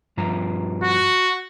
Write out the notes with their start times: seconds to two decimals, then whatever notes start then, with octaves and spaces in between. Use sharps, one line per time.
0.17 G2 F3 A#5
0.83 F#4